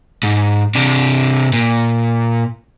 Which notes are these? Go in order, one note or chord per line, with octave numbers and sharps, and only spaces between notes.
G#2
C3 D4
A#2